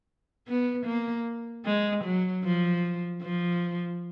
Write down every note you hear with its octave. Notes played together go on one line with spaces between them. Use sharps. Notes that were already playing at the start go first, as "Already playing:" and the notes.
B3
A#3
G#3
F#3
F3
F3